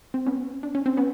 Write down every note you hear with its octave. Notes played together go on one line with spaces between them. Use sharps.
C4
B3 C#4
D4
C#4
C4
B3 C#4